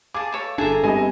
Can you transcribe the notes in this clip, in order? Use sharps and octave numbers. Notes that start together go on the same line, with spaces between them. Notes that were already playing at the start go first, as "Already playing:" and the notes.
G#4 F5 A5 D6
A4 C#5
G1 D4 G#4 A4 E5 A5 A#5
G2 G#3 B3 C4 G4 D#5 G#5